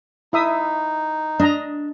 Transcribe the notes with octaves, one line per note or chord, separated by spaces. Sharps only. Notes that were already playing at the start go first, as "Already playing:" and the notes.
D#4 E4 E5 D#6
D4 D#5 A#5